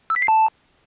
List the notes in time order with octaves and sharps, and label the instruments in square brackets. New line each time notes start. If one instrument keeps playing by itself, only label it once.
[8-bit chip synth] E6
B6
C7
A5